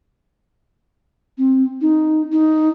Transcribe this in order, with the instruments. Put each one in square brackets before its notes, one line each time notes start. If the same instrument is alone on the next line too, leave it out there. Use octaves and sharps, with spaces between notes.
[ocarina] C4
D#4
D#4